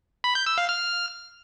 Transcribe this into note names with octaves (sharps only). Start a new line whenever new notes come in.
B5
G6
E6
F5
F6